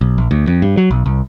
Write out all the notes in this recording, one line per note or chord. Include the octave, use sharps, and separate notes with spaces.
B1
A#1
D2
F2
G2
F#3
B1
C2